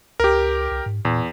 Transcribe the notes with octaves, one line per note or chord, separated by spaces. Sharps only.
C#2 G4 A#4
C2
G#2
E2 A#2